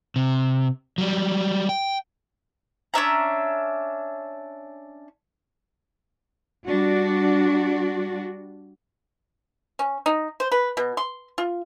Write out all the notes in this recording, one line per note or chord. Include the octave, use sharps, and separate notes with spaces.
C3
F#3 G3
G5
C#4 D4 E5 A#5
G3 D4 F#4
C#4
D#4
C5
B4
B2
C6
F4